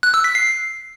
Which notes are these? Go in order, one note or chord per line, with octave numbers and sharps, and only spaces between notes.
F#6
E6
B6
C7